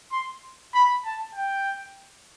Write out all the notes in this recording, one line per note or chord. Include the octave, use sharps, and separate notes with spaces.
C6
B5
A5
G5